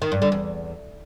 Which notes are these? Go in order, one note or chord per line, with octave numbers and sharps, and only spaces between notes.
D#3
G2
D3
E2